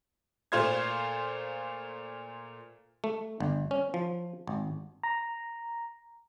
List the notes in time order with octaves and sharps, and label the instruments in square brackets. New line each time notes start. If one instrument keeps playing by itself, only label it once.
[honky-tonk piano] A#2 A3 F4 C5 F5 G#6
[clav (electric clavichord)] A3
G1
C#4
F3
G#1
[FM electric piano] A#5